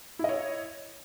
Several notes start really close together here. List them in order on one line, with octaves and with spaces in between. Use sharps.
E4 D#5 C#5